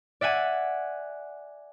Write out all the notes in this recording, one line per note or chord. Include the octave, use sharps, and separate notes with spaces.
D5 E5 F#5 G#5